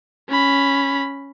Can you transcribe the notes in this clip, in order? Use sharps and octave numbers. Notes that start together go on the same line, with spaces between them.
C#4 B5